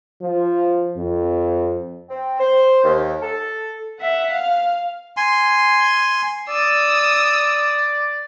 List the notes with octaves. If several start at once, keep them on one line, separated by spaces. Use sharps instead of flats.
F3
F2
C4
C5
D#2
A4
E5 F#5
F5
G#5 C6
D5 D#6 E6